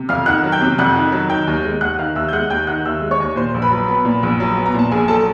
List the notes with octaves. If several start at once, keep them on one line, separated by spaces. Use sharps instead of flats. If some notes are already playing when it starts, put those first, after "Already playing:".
Already playing: C3
F2 F5 F6
D#3 F#5 F#6
F#3
G5 G6
C3
F2 F#5 F#6
D#3
F#3
D#3 G5 G6
D#2
G#3
D#2 F#5 F#6
D#3 F5 F6
D#2 E5 E6
G6
G#3 F#5 F#6
D#2 G5 G6
D#3 F#5 F#6
D#2 E5 E6
G#3
C#5 C#6
D#2
A#2 C5 C6
A#1
B4 B5
F#3
B3
A#2
A#1
F#3
B3
A#5
A#2 A5
A#1 G#4 G#5
F#3 A4 A5